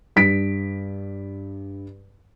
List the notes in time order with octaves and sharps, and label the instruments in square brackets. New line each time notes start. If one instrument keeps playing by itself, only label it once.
[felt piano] G2 B6 D7